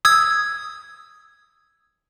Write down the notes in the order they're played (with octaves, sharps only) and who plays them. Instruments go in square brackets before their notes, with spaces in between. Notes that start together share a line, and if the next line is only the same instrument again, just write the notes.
[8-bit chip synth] D#6 E6 G#6